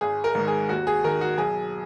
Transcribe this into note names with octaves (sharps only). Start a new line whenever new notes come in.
G#1 G#4
A#4
G#2 D#3
G#4
D#2 F#4
G#4
D#3 A#4
F#4
B1 G#4